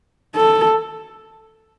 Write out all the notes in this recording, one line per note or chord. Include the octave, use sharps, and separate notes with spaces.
A4